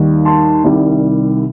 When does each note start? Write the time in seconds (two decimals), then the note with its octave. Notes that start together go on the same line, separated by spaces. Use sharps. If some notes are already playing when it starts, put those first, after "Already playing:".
Already playing: D#2 D#3 G3
0.25 A5 C6
0.64 C2 C3 D#3 G3